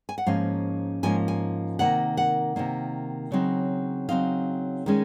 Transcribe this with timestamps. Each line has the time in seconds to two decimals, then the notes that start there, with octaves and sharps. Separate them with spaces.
0.09 G#5
0.18 F#5
0.26 G#2 F3 A#3 C#4 F5
1.03 G#2 F3 A#3 C#4 G#5
1.28 G#5
1.79 C3 D#3 A#3 F#5
2.17 F#5
2.56 C3 D#3 A#3
3.32 C#3 F#3 C4 D#4
4.09 C#3 F#3 C4 D#4 F5
4.86 D#3 G#3 C#4